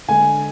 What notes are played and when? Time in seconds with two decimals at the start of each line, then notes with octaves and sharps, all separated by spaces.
0.08 D3 G#3 G#5